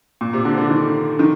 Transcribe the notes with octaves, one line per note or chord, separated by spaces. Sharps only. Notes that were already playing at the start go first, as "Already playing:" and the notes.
A#2
C3
D3
D3
D#3
D#3